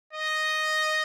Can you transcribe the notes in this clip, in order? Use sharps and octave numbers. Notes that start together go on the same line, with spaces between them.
D#5